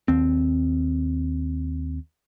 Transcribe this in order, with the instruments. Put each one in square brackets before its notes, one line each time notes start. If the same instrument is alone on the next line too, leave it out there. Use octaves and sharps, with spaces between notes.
[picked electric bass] D#2 C4